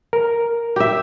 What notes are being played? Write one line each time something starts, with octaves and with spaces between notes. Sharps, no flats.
A#4
G4 E5